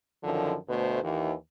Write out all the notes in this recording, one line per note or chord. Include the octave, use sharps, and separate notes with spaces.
F#2 D3 D#3 F3
D2 B2 A3 C5
D#2 E3